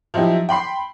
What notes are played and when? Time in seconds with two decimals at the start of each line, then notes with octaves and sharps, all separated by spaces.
0.14 F3 F#3 D#4 E4 G4 E5
0.49 G5 B5 C6 C7